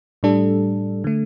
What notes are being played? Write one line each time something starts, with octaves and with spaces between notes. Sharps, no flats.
A2 G3 D4 A4
D3 A3